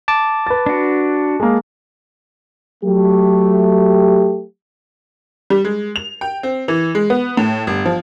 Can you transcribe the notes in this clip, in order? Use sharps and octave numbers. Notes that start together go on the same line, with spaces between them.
A5 D6
B4 A6
D4 F#4
G#3 A#3
F#3 A3 G4
G3
G#3
F7
G5
C4
E3
G#3
B3
A2
G1
F3